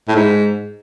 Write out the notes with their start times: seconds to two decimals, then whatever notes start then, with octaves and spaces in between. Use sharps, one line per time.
0.08 A2
0.16 G#2